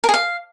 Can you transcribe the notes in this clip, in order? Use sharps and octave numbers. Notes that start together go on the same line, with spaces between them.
A#4
G#4
F5